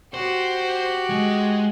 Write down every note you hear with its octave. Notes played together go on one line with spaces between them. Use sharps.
F#4 G4 C5
G#3